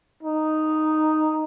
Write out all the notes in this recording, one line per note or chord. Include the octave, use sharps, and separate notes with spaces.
D#4